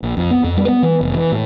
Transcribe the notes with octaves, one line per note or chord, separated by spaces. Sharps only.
A#1
F2
B3
F2
G3
B3
E3
F1
E3
A2